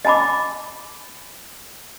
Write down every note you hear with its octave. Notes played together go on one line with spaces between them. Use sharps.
D#5 G#5 A5 B5 D6